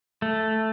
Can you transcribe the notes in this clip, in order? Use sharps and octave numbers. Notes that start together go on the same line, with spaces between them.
A3